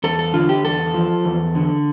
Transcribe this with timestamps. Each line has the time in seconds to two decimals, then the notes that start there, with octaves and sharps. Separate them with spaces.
0.04 E2 A4
0.19 A4
0.34 D3 F4
0.49 G4
0.64 E2 A4
0.94 F3
1.25 E2
1.55 D3